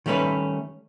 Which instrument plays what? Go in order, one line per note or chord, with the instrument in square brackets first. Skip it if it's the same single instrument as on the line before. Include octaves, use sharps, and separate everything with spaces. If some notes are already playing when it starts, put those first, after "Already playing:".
[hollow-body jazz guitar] D#3 G3 A3 C#4 B4